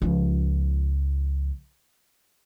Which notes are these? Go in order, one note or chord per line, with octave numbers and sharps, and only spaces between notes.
C#2 F3